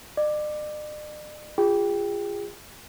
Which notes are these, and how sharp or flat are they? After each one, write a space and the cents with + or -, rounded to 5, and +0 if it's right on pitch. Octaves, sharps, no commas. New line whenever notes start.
D5 +45 D6 +10
F4 +0 G#4 -25 G5 +0